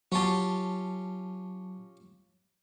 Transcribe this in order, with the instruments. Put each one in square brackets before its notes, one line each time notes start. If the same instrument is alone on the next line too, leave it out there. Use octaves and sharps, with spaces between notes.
[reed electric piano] F#3 A5 [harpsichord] C#4 F4 G4